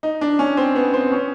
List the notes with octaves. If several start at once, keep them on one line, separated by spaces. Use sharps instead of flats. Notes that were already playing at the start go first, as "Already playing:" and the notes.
D#4
D4
C#4
C4
B3
C4
C#4